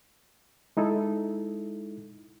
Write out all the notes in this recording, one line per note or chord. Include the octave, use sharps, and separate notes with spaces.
G#3 D#4 E4 A4